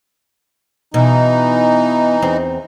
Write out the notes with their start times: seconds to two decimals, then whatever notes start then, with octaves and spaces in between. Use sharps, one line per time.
0.94 B2 E3 D#4
2.22 E2 C4